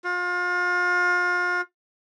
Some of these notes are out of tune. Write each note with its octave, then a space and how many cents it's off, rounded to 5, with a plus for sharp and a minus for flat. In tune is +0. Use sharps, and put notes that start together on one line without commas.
F4 +35